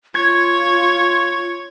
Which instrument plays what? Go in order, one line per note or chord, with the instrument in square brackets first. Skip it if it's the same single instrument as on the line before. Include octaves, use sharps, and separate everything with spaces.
[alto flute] F4 [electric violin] C#5 [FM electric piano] G#6